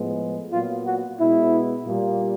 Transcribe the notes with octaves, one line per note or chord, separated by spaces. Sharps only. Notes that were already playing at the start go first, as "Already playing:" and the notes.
Already playing: A2 F3 G#3 B3
A#2 F#3 B3 F4
F#4
B2 G#3 B3 E4
A#2 G3 A#3